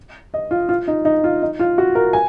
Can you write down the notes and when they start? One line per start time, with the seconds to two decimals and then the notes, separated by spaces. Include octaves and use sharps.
0.34 D#5
0.51 F4
0.69 F4
0.88 D#4
1.05 D#4
1.24 F4
1.42 D#4
1.59 F4
1.78 F#4
1.95 A#4
2.13 G#5